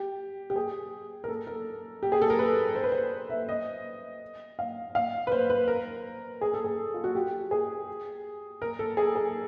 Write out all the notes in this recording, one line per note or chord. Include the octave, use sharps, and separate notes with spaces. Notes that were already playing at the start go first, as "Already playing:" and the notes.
Already playing: G4
G4
G#4
A#4
A4
A#4
G4
G#4
A4
A#4
B4
C5
B4
C5
E5
D#5
F5
F5
B4
C5
B4
A#4
G#4
A4
G#4
F4
F#4
G4
G#4
A#4
A4
G#4
G#4